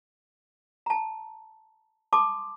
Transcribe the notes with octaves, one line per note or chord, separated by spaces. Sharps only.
A5 A#5
A5 C6 D6 D#6